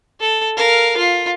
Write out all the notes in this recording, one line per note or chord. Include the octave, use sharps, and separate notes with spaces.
A4
A#4 F5
F4